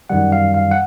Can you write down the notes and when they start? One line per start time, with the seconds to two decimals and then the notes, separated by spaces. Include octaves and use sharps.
0.09 F#2 D#3 G3 F#5
0.32 F5
0.54 F5
0.71 F#5